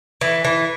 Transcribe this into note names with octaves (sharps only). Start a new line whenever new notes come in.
E3
E3